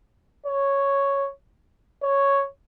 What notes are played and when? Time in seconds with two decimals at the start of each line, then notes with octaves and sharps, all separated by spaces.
0.46 C#5
2.03 C#5